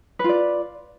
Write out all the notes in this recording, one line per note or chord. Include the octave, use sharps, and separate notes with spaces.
F4 B4 D5